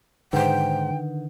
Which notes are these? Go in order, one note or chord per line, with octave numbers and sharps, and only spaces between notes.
G#2 D3 D#3 B4 C5 F#5 G5 G6